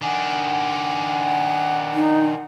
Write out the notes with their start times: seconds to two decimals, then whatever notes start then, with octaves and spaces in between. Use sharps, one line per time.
0.02 D#3 D4 F#5 G#5
1.94 D#4